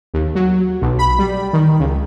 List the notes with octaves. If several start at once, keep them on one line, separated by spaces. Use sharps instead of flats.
D#2
F#3
B1
B5
G3
D#3
C#2